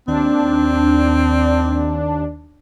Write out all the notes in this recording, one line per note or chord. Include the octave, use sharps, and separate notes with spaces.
D#2 C4 D4